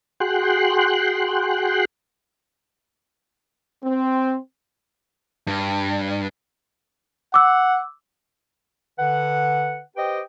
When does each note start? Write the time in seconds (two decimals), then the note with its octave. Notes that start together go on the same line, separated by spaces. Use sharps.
0.20 F#4 G#4 G5 C6 F#6
3.84 C4
5.47 G2
7.34 F#5 D6 E6
8.99 D3 B4 F#5
9.97 G4 B4 C5 D#5 G5